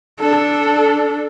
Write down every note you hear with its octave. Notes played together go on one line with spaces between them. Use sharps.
D4 A4